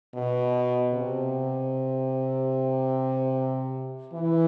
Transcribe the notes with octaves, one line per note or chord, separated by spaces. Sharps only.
B2
C3
E3